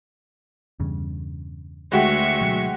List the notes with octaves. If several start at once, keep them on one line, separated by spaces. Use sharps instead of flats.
E2 G2 C#3
D2 G#3 F#4 G4 E5 C#6
B2 F#3